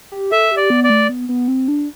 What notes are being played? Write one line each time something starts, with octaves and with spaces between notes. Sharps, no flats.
G4
A4 E5
G4
D5
B3
D5
A3
B3
B3
C4
D4